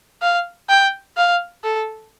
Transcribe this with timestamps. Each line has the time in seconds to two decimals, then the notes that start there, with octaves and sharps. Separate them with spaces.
0.22 F5
0.69 G5
1.17 F5
1.64 A4